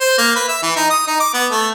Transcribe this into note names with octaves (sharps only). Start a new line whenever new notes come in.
C5
A#3
B4
E5
E3
D#4
D#6
D#4
D6
B3
A3